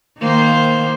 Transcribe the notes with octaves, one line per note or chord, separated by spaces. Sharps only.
D#3 A#3 C5